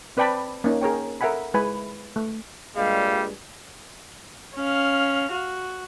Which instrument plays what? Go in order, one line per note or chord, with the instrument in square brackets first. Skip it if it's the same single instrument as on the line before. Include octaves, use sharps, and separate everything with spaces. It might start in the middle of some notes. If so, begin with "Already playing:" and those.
[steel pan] C4 B4 D5 G5 A5 B5
A#3 C#4 D#4
G#4 A#4 C#5 G5
A4 A#4 E5 F#5 G#5 B5
G#3 E4 B4 G#5 B5
A3
[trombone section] G2 A#2 G#3 [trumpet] G3 [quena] F5
[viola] C#4 F5
F#4